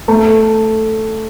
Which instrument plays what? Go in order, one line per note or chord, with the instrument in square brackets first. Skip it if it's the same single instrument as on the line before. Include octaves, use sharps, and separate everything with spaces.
[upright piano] A3